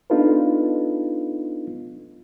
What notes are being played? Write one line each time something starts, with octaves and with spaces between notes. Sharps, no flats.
B3 D4 D#4 F4 A4 B4